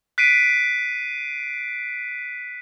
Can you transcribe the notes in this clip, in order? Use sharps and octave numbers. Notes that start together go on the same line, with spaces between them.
F#6 B6 C7 D7 D#7